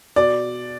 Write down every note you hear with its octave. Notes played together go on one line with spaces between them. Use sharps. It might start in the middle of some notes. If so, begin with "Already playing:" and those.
B2 D5